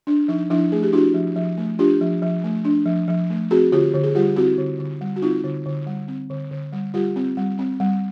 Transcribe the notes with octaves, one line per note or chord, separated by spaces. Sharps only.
D4
F3 D#4
F3 D4 E4
A3 G#4
G4
D4 E4 F#4
F3
F3
A3
D4 F4 G4
F3
F3
A3
D4
F3
F3
A3
C4 F#4 G#4
D3 F4 G4
D3
G#4
G3 F4 G4
C4 E4 F#4
D3
D3
G3
F#4
C4 D#4 F4
D3
D3
G3
C4
D3
D3
G3
G3 F4 G4
C4
G3
C4
G3